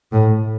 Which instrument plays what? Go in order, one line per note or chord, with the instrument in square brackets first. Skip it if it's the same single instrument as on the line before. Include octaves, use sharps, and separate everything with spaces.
[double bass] A2